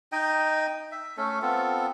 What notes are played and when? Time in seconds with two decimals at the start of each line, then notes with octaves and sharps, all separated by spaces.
0.12 D#4 D#5 G5
0.92 E5
1.17 A3 C#4 A4
1.42 B3 C4 F4 A4